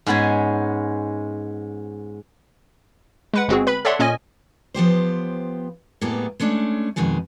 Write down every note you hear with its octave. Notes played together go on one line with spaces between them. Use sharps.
G#2 G#3 B3 C#4 G#5
G#3 B4 F#5
G1 G#3 C4 F#4 G#4
B4 B5
A4 C#5 D5 E5 F#5 C6
A#2 C#4 D#5 G#5
F3 B3 G4 C5
A2 G3 A#3 B3 G#4 A4
G#3 A3 C#4 D4
F2 B2 D#3 G#3 G#5